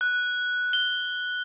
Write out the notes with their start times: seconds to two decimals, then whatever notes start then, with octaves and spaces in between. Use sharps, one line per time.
0.01 F#6
0.73 G7